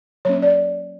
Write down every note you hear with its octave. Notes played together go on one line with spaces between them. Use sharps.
F#3 A#3 C#4 C#5
D5